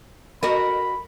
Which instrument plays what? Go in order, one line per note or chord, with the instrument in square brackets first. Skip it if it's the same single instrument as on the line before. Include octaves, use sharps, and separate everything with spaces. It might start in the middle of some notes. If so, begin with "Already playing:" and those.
[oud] F#4 A#4 D#5 [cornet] B5